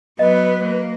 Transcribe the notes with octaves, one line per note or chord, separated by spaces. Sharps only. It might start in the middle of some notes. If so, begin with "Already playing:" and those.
F#3 B3 B4 D#5
A#3